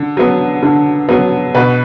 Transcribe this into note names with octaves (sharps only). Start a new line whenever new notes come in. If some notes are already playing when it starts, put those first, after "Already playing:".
Already playing: D3
F#3 B3
D3
F#3 B3
B2 B4